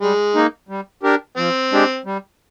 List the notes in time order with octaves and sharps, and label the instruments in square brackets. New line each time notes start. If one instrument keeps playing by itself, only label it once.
[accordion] G3 [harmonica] G#3
[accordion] A#3 D#4
G3
D4 G4 A#4
[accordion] F3 [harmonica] C4
[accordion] G#3 D4 G4
G3